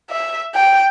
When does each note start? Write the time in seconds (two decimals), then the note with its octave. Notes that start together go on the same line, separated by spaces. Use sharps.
0.10 E5
0.55 G5